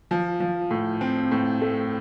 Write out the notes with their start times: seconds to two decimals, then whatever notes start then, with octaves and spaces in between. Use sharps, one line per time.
0.11 F3
0.40 F3
0.71 A2
1.01 C4
1.31 A2
1.62 A3